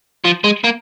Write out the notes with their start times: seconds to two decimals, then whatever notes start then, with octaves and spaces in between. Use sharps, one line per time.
0.25 F3
0.44 G#3
0.64 A#3